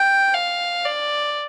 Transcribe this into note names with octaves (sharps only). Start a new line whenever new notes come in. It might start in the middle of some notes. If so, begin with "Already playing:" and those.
Already playing: G5
F5
D5